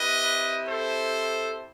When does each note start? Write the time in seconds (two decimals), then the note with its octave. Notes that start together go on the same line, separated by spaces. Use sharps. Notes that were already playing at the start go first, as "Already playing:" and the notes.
Already playing: C4 E4 G4 B4 D#5
0.67 A4 C5